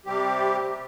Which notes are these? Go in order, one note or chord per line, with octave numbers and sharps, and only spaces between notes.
C3 G3 C4 G4